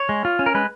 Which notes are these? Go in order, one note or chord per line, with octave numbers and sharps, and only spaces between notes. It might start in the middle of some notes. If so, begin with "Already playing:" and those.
Already playing: C#5
G#3
F4
C#4
A#4
G#3 B4